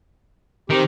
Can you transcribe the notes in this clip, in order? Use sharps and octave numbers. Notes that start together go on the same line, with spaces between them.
D#3 C4 G4